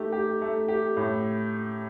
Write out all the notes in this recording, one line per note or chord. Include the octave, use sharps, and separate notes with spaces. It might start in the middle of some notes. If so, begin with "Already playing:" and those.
Already playing: A3 D#4 G4
G4
A3
G4
A2